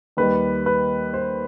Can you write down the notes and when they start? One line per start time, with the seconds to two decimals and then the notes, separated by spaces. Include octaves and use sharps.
0.17 D#2 D#3 G3 B4
0.66 B4
1.14 C5